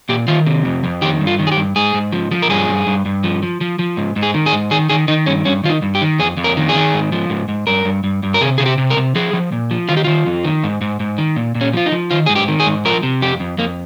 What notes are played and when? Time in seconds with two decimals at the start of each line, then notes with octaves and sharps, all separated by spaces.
0.09 A#2 G4
0.28 D#3 F4
0.46 C3
0.65 F2
0.84 F2
1.02 D#3 G4
1.21 G2
1.27 F4
1.39 D#3
1.47 G#4
1.52 G4
1.57 G2
1.76 G#2 G#4
1.94 G#2
2.13 F3
2.31 F3
2.42 A#4
2.49 G2 G#4
2.68 G2
2.87 G2
3.06 G2
3.24 F3
3.43 F3
3.61 F3
3.79 F3
3.97 G#2
4.16 G#2
4.23 G#4
4.34 D#3
4.46 G#4
4.52 G#2
4.71 D#3 G#4
4.89 D#3 G#4
5.08 D#3 D#4
5.26 G2 C#4
5.45 G2 C#4
5.64 D#3 F4
5.70 D#4
5.82 G2
5.95 G4
6.01 D#3
6.19 F2 G#4
6.37 F2
6.44 A#4
6.57 D#3
6.69 G#4
6.75 D#3
6.94 G#2
7.12 F3
7.30 G#2
7.49 G#2
7.67 G2 A#4
7.85 G2
8.04 G2
8.23 G2
8.34 A#4
8.41 C3 G#4
8.58 C3 G#4
8.66 G4
8.78 C3
8.90 A#4
8.97 C3
9.15 F3 G#4
9.33 F3
9.52 A#2
9.71 F3
9.89 D#3 F4
9.97 G4
10.04 D#3 F4
10.26 F2
10.44 D#3
10.64 G#2
10.81 G#2
11.00 G#2
11.18 D#3
11.36 A#2
11.55 A#2
11.61 C#4
11.73 F3 F4
11.86 D#4
11.92 F3
12.11 D#3 F4
12.26 G#2 G#4
12.36 G4
12.48 D#3
12.60 G#4
12.66 G#2
12.85 F3 A#4
13.03 C3
13.22 F2 G4
13.40 F2
13.58 F2 A#3